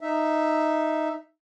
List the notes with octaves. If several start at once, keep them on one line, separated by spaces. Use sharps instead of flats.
D#4 E5